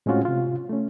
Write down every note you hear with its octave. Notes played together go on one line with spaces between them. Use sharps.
A2 G#3 C4 C#4 F4 F#4
C3 F4
A3 C#4